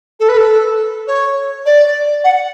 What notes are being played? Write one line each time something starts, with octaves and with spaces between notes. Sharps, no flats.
A4
B4
A4
C#5
D5
F#5